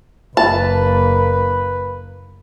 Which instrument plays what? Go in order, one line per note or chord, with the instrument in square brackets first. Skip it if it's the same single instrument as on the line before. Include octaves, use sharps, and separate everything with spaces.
[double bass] F#1 A#3 [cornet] B4 [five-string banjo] A5